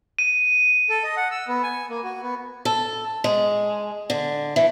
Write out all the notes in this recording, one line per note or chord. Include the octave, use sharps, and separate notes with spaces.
D#7
A4
D#5
F#5
E6
B3
G#5
A#3
F#4
B3
A4
G#3
D3
E3